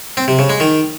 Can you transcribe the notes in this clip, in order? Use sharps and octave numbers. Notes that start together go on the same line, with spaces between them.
C4
C3
C#3
G#3
D#3